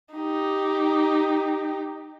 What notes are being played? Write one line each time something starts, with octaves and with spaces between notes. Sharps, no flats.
D#4 G4